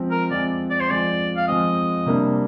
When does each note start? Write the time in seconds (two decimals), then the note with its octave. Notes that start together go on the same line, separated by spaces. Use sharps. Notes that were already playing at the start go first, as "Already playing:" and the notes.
Already playing: F3 G#3 C4
0.11 A#4
0.31 F3 G#3 C4 D5
0.70 D5
0.80 C5
0.90 F3 G#3 C4 D5
1.36 F5
1.48 F3 G#3 C4 D#5
2.06 C3 G3 A#3 D4